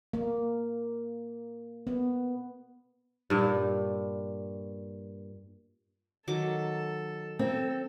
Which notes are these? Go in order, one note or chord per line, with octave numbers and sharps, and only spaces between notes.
A#3
B3
G2 A#2
D#3 F#3 A4 D6
C4 A4